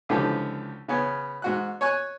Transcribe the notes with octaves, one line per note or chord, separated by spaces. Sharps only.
C#2 D3 E3 F3 G4
C#3 B3 C#4
G#2 F#4 F#6
C#5 G#5 C#6 F#6